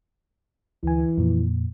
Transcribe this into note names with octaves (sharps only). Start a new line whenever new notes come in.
D2 E3 G#5
F2 A#2